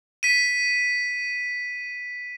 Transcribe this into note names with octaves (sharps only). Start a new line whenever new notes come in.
B6 D#7